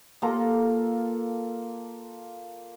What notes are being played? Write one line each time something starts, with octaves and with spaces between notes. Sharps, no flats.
A#3 F4 A4 A#5